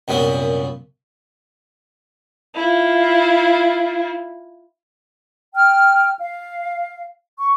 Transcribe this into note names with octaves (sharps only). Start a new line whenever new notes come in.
C2 F#2 A#2 B3
E4 F4
G5 F6
F5
C#6